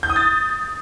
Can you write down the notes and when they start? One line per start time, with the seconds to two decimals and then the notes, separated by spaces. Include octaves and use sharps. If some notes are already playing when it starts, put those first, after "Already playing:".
0.03 G6
0.10 D#6
0.16 A6